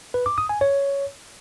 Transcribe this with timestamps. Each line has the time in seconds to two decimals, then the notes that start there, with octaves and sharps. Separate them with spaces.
0.14 B4
0.26 D6
0.38 D#6
0.49 G#5
0.61 C#5